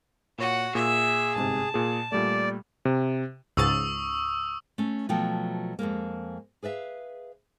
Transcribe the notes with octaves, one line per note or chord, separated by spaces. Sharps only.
A#2 F#4 C#5 F#5 D#7
A#2 G#4 E5
G1 G#2 C3 A5
A#2 G#4
A#2 G3 A3 D5
C3
C#2 G#2 C#6 D#6 E6 A6
A3 C#4
B2 F3 F#3 A3 G5
F2 A#2 G#3 A#3
G#4 B4 D5 E5 F5